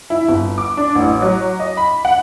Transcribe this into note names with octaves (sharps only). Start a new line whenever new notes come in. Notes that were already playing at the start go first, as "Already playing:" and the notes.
E4
G1
D6
D4
A1
F#3
D#5
B5
F#5